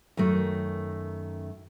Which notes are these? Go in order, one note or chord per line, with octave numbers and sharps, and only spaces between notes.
F#2 D#3 A3